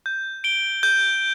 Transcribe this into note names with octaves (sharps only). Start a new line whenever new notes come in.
G6
D7 G7
G6